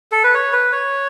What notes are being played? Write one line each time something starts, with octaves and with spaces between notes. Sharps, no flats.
A4
B4
C#5
B4
C#5